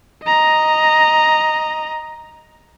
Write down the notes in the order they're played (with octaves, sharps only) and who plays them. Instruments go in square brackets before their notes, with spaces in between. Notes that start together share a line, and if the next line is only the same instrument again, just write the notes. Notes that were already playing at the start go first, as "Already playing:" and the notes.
[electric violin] D#5 A#5